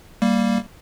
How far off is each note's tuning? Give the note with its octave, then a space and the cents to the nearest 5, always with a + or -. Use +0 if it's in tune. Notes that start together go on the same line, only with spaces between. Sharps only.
G3 +0 A#3 +0